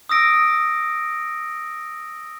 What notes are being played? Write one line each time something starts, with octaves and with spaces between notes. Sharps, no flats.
D#6 E6 A#6 D7